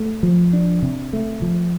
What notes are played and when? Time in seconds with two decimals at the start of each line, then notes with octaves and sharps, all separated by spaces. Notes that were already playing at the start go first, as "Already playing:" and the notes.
Already playing: A3
0.23 F3
0.53 D4
0.82 C3
1.13 A3
1.42 F3